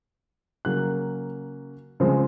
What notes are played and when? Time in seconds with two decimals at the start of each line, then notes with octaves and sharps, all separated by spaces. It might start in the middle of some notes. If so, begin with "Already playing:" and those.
0.65 C#3 F#3 A#3 F#6
2.00 C#3 F3 G#3 C4